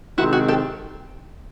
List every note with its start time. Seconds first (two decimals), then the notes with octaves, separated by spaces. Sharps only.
0.18 C3 D#3 G#3 C4 E4 F#4
0.33 F#4 G#4
0.48 G4 A4